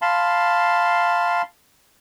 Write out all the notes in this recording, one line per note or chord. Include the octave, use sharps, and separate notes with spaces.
F5 A5 B5 C6